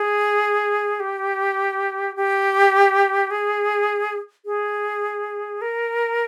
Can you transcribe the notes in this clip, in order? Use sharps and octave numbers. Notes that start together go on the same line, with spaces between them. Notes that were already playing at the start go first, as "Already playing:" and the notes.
Already playing: G#4
G4
G4
G#4
G#4
A#4